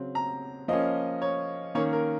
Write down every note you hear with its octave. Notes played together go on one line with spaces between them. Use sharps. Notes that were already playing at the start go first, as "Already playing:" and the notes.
Already playing: C#3 F#3 C4
A#5
F3 A#3 C#4 D#5
C#5
D#3 A#3 C#4 C#5
A#4